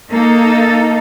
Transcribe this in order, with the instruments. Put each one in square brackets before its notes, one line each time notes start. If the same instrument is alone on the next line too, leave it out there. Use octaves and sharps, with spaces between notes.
[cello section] A#3 D#4 A4